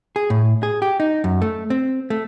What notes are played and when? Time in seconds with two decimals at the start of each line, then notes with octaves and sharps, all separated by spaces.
0.16 G#4
0.30 A2
0.63 G#4
0.82 G4
1.00 D#4
1.24 F#2
1.42 A3
1.70 C4
2.10 A3